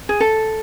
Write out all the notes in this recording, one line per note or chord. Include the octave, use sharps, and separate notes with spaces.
G#4
A4